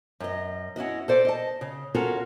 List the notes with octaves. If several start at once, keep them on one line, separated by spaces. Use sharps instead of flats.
F#2 D#5
C#4 E4 F#4 D#5
A4 C5 D5
D#5 A5
C#3
C#4 F4 F#4 A4 A#4 C#5